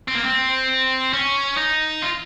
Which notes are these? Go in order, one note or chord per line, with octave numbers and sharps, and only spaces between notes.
C4
A#3
C4
C#4
D#4
F4